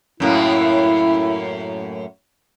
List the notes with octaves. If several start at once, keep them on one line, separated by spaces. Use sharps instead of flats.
F#2 A2 A#3 E4